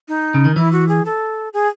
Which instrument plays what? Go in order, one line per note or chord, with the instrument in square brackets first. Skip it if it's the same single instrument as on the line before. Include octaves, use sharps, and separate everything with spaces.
[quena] D#4
[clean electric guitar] C#3
D#3
[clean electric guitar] E3 [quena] E4
[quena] F#4
G#4
A4
G#4